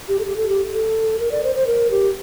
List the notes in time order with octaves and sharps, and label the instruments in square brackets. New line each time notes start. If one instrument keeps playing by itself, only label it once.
[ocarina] G4
A4
G4
A4
G4
A4
A#4
D5
C5
C5
A#4
G4